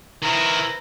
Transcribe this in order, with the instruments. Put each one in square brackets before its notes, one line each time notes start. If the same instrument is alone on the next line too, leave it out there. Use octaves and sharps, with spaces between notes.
[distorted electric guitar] D#3 E4 [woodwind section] B4 C5 A#5